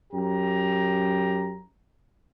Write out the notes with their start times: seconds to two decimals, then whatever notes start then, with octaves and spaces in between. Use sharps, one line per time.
0.12 F#2 G4 A#5